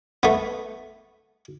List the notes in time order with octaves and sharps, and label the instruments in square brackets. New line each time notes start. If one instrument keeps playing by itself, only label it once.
[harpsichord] A3 B3